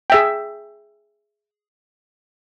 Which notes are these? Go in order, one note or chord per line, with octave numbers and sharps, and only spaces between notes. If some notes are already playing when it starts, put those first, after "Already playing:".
G#4 E5 G5